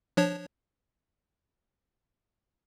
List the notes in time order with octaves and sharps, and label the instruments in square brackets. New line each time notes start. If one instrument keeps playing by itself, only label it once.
[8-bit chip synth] F3 D4 C#5